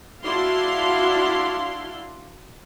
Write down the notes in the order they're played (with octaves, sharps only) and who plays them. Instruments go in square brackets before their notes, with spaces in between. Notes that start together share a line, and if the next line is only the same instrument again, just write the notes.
[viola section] D4 E4 F#4 F5 C6